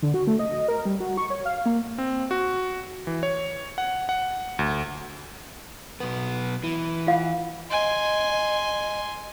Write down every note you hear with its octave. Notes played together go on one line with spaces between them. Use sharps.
D3
F#4
A3
D#5
D#5
A#4
G3
F#4
C#6
C#5
F5
A#3
C4
F#4
E3
C#5
F#5
F#5
D2
B1 B3
E3
F4 F5 F#5
D#5 G#5 C6